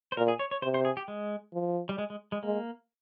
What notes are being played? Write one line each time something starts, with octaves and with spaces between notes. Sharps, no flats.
C5
A#2 A#4
G#4
C#5
C#5
C3 C5
C5
G#4
G4
G#3
F3
G3
G#3
G#3
G#3
G#3 A#3